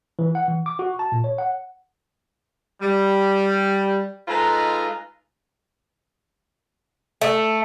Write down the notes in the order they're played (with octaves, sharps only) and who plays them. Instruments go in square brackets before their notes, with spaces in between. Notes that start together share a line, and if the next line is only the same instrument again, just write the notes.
[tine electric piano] E3
F#5
E3
D6
F#4
A5
A#2
C#5
F#5
[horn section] G3
G#3 D#4 F4 A4 B4 A#5
[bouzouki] A3